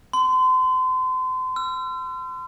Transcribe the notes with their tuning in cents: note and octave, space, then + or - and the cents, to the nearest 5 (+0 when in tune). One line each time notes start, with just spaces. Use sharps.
C6 -35
E6 +45